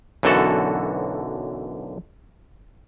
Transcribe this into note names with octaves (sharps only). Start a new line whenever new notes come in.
B1 F#2 D3 E3 F#4 A4